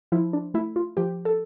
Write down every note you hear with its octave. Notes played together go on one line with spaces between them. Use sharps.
F3 E4
D4
A3 E4
F4
F3 G4
A4